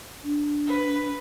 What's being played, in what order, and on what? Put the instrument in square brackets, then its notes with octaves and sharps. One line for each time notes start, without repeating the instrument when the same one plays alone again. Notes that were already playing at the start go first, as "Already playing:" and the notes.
[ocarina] D4
[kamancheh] B4